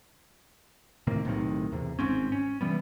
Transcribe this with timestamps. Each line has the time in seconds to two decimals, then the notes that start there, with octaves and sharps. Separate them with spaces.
1.07 A2 C3 D#3 A#3
1.25 B1 A2 C3 D#3
1.72 E2 C3
1.99 G#1 G#2 C4 C#4
2.32 C#4
2.61 C3 E3 G3 B3